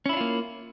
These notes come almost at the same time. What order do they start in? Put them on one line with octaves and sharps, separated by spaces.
C#4 E4 D4 F4 A#3